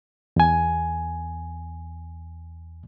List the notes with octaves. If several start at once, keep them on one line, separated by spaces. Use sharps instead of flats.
E2 G#5